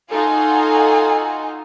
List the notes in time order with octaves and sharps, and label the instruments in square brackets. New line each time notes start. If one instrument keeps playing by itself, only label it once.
[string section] D#4 F4 F#4 [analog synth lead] A4 [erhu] G#5